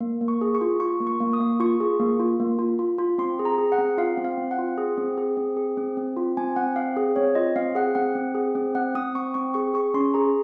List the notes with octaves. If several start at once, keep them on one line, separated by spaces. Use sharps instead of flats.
A#3
A#3
C#6
G#4
C#6
F4
F4 C#6
A#3
C#6
A#3
D#6
A#3
F4 C#6
G#4
A#3
F4
A#3
F4
F4
F4
C4 C6
G#4
A#5
G#4
F#5
C4
F4 F5
C4
F5
C4
F#5
F4
G#4
C4
G#4
C4
G#4
C4
C4
F4
C4 G#5
C4 F#5
C4 F5
G#4
C4 C#5
F4 D#5
C4 F5
G#4 F#5
C4 F#5
C4
G#4
C4
C4 F#5
C4 D#6
C4 C#6
C4 C#6
G#4 C#6
G#4 C#6
C#4 C6
G#4 A#5